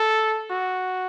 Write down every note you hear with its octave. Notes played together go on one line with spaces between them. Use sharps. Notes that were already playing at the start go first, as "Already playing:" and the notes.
Already playing: A4
F#4